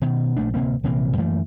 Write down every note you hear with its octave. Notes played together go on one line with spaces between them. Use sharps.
B2 D#3
A#1 A3 D4
D1 C3 A#3 C4
A#1 C3 E3 A#3
F#2 E3 A3 A#3